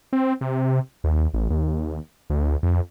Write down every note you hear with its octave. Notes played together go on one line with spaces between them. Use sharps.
C4
C3
D#2
A1
D#2
D2
F2